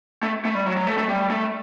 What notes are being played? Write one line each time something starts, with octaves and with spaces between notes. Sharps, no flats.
A3
A3
G3
F#3
F#3
A3
A3
G3
A3